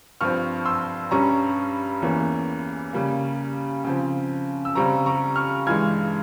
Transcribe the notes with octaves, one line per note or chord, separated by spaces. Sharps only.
G2 F3 C4 C#6 F6
C6 E6
G2 G3 C#4 A#5 C#6
E2 E3 A#3 C#4
C#3 G3 A#3
C#3 F3 C4
E6
C#3 G3 C4 A#5 C#6
A#5 C#6
C#6 F6
G2 E3 G#3 F6 G#6